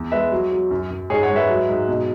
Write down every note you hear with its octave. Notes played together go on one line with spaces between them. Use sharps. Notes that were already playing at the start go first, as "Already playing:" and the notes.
Already playing: E2
G#3 B4 E5
F#3
F#3
F#2
F#2
G#2 G#4 C#5
C#5 F#5
G#3
B4 E5
F#3
G#2
B2